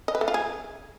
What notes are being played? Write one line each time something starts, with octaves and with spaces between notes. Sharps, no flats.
D#5
B4
A3
F4
G#4